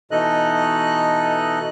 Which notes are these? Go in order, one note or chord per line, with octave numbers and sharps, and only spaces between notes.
B2 E3 D#4 A4 D#5 F#6